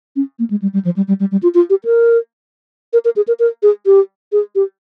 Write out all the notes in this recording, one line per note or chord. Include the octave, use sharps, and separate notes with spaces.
C#4
A#3
G#3
G3
G3
F3
G3
G3
G3
G3
F4
F4
G4
A#4
A#4
A#4
G#4
A#4
A#4
G#4
G4
G#4
G4